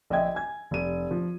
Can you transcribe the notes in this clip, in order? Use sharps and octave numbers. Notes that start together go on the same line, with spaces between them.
A#1 D#5 E5 G5 G#6
G#5 G#6
F1 D#7
F3